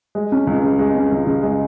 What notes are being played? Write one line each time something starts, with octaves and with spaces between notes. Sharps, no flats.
G#3
C#4
C#2
C#3
G#3
C#4
C#2
C#3
G#3